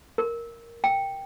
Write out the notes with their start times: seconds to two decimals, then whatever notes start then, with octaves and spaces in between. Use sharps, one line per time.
0.18 A#4
0.84 G5